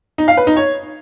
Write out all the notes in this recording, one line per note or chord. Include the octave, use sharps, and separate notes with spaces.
D#4
F5
B4
D#4
C#5